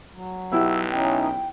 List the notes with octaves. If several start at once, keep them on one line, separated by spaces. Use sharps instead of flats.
F#3
B1 B3 E4 G4 E6
E3 C#4 D#4 G5